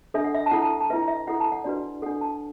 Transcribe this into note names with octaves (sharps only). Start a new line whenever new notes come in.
D4 A4 E5
F#5
E5
A5
E4 A4 F#5
A5
A5
E4 B4 E5
E5
E4 A4 F#5
A5
F#5
D4 F#4 B4 D5
D4 A4 F#5
A5